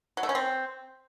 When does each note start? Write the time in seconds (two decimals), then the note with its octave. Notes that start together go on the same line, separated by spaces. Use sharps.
0.17 F#3
0.23 A3
0.29 C#4
0.35 C4